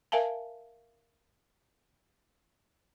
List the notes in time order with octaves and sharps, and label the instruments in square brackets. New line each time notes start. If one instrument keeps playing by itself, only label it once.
[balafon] A#4 E5 F5 G#5 A5